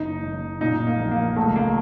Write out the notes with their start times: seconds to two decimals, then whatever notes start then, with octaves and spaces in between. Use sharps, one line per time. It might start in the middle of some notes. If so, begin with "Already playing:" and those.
Already playing: F#1 D#4
0.23 F#1
0.61 A#2 D#4
0.87 A#3
0.98 A#1
1.11 A#3
1.36 C#2 A3
1.56 A#3